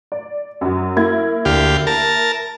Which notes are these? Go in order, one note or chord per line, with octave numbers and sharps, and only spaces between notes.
D5
F#2 F#3
A#3 E4 G#6
D2 G4 F5
A#4 A5